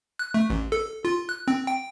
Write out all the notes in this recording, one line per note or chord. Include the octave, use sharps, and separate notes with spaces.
F#6
A3
A1
A4
F4
F#6
C4
G5